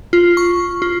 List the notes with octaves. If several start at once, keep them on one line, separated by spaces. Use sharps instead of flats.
F4
C#6
F4